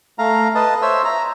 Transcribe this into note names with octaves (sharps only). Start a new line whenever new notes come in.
A3 F5 A#5
B4 D#5 A5
C5 C#5 E5 E6
A#5